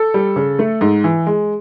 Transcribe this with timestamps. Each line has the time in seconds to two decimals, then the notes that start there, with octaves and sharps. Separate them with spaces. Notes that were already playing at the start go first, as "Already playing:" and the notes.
Already playing: A4
0.14 G3
0.36 C#3
0.59 A3
0.81 G#2
1.04 E3
1.27 G#3